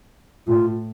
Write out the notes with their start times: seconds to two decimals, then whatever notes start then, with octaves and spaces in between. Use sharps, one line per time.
0.47 A2 F4